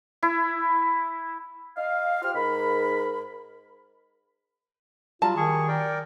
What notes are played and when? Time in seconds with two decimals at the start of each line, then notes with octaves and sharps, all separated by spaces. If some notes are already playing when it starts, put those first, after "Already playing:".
0.23 E4
1.77 D#5 F5
2.22 F4 G4 C5 F6
2.35 G#2 A#4 B5
5.22 F#3 G3 F4 A5
5.36 D#3 G#4 C#6
5.68 A#4 D5 G5